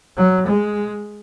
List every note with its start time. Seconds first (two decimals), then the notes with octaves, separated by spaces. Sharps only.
0.17 F#3
0.46 G#3